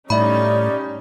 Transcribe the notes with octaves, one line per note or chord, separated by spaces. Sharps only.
A2 G3 C#4 D#4 D5 E5 B5